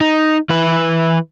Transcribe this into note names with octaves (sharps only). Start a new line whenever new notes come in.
D#4
E3 B4